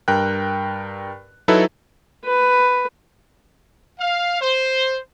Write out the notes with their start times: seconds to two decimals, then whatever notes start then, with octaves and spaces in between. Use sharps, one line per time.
0.08 G2 A#4 G5 F#6
1.48 F#3 D#4 E4 A4 B4
2.25 B4
3.99 F5
4.41 C5